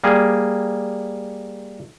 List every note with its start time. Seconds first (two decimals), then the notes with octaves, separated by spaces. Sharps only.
0.04 G3 A#3 G#4